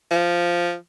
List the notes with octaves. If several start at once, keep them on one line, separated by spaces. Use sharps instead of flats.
F3